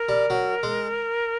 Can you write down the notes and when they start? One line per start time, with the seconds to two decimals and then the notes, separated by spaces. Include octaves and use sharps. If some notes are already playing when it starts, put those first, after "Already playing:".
Already playing: A#4
0.09 G3
0.30 F#3
0.63 G#3